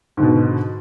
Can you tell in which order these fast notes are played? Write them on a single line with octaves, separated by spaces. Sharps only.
G#2 D3 B2